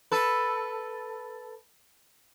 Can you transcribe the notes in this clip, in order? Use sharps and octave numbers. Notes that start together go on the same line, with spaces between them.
A4 B4